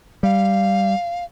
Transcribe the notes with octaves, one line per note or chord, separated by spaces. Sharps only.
G3 F5